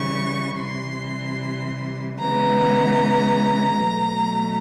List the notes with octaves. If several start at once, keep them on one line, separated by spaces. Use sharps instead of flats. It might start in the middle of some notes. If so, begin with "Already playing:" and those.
Already playing: C#3 E3 G3 C#6
C3 E3 G3 C6
C#3 E3 G#3 B3 A#5
B2 F#3 A3